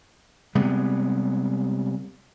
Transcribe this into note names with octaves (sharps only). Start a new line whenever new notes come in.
C3 G3 G#3 B3